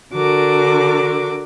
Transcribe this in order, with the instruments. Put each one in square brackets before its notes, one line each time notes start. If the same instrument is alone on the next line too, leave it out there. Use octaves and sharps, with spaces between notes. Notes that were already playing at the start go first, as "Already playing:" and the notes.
[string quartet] D3 F#4 A#4 D6